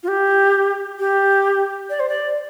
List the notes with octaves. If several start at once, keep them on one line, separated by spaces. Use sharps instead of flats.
F4
G4
G4
D5
C5
D5